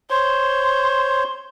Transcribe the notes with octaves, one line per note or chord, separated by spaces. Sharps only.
C5 C#5 C6